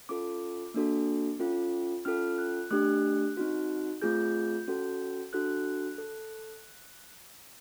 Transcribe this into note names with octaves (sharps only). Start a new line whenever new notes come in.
C#4 F4 A4 D6
A#3 D4 F#4 A4
C#4 F4 A4
C#4 F4 A4 F6
F#6
A3 D4 G4 F#6
C4 D#4 F#4
A3 C4 F4 G#4 G6
C#4 F#4 A4
D4 F#4 A4 F#6
A4